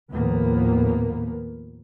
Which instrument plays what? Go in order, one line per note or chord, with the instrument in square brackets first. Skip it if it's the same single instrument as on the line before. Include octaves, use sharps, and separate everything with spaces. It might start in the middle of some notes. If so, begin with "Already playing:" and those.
[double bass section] D#2 A2 F3 A#3 B3